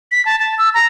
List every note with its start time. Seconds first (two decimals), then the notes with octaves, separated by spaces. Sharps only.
0.12 B6
0.25 A5
0.39 A5
0.58 E6
0.74 A#5